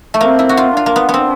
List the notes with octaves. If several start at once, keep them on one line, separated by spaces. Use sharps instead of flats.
A3
A#3 C4
E4
F#4
F4
D4 F4
A#3
B3
B3
C4